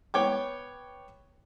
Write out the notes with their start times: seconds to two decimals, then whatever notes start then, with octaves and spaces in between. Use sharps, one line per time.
0.14 B3 C#5 G5 D6